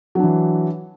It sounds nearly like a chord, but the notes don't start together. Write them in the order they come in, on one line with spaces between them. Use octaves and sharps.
F#3 D4 E3